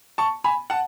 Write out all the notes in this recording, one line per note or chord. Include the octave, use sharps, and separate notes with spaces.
A5 C#6
G#5 B5
F#5 A5